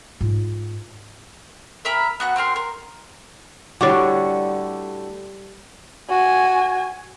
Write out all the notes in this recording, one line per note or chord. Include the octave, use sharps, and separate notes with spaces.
G#2 F4
A#4 E5 A#5 B5
B3 F#4 F#5
C4 F#4 A#4 C6
A#4
A2 D3 G3 F#4 G4 C#5 D6
F#4 G#5